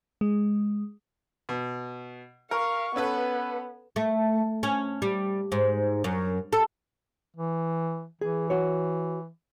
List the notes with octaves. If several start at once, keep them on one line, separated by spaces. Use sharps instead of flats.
G#3
B2
A#4 F5 C#6
B3 C#4 A4 B4
A3
C#4
G3
G#2
F#2
A4
E3
E3 G#4
F#4 C#5